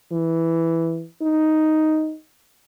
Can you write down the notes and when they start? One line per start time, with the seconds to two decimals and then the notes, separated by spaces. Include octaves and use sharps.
0.12 E3
1.22 D#4